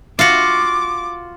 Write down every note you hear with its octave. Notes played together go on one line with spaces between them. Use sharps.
F4 F#4 D6